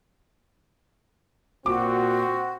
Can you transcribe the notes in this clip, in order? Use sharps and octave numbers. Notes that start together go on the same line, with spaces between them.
A#2 C4 F#4 D6